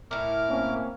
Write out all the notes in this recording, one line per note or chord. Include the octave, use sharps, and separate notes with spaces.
A2 E4 A#4 D6 F6
A#3 C4 C#4